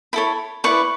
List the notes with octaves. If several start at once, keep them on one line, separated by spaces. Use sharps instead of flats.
E4 A4 C#5 B5
E4 B4 D5 C#6